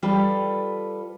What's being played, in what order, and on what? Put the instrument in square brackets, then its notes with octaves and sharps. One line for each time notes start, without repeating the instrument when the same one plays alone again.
[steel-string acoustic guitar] G3 F4 A4 B4